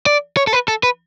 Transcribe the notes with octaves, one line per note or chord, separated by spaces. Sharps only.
D5
C#5
A4
B4
A4
B4